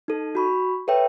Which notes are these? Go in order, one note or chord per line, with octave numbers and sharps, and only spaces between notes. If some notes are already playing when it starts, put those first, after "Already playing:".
D#4 A4
F#4 B5 C#6
A4 B4 C#5 E5 G5